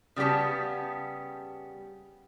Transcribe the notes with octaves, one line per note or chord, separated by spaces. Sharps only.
C#3 G3 B3 G4 A5